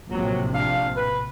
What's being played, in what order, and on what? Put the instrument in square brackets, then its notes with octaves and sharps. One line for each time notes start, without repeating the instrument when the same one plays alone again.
[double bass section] A#1 A2 C3 [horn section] F#3
[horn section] D4 F5
B4